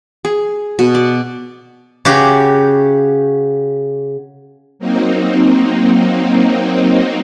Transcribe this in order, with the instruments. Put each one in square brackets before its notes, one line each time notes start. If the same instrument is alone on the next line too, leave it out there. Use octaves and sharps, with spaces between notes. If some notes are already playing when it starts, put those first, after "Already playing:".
[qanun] G#4
B2
D5
[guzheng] C#3 F#4 G4
[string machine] F#3 A#3 C4 D#4